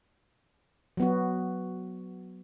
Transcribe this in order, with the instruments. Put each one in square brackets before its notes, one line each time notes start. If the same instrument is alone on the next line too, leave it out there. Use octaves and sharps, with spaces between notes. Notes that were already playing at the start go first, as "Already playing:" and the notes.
[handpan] F#3 B3 F#4